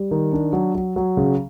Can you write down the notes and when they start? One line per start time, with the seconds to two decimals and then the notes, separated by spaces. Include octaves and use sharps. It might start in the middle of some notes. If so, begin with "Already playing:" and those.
Already playing: G3
0.11 D#3
0.32 D4
0.53 F#3
0.75 F#3
0.96 F#3
1.17 C#3